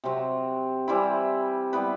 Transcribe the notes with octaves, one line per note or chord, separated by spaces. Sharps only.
C3 F#3 C4
E3 G3 C4 E4
G3 B3 E4 B4